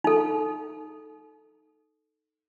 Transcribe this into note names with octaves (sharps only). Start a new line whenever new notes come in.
D#4 A4